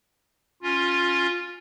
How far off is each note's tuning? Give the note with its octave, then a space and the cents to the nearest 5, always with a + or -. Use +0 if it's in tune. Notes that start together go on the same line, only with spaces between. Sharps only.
C#4 +0 F4 +10